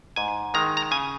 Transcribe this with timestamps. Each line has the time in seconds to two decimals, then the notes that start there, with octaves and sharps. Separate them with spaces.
0.16 G#2 G#5
0.54 D#3 G#3 A#5
0.77 A#5
0.91 C#3 G#5